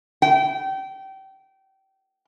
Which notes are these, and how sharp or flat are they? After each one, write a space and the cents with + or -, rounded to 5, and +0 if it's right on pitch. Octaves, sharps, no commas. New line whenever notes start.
G5 -25